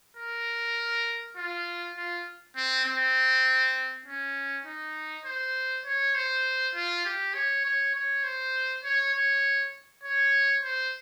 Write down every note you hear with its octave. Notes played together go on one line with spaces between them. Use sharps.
A#4
F4
F4
C4
C4
C#4
D#4
C5
C#5
C5
F4
G4
C#5
C#5
C#5
C5
C#5
C#5
C#5
C5